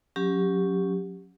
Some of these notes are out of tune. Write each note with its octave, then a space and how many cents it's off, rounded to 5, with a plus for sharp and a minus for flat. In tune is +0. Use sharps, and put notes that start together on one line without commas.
F#3 -25 C#4 +0 G4 +0